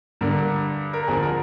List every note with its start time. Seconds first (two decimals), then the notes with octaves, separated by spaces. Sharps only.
0.21 G2 D3 A#4
0.93 A#4
1.08 F2 D3 G#4
1.23 A#4